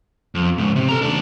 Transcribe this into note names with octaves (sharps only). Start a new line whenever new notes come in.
F2
C#2 G#2
C3
A4 A#5
D#2 D4